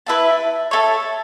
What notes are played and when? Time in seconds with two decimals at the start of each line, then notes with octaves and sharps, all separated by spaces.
0.07 E4 B4 E5 A5
0.71 E4 A4 C#5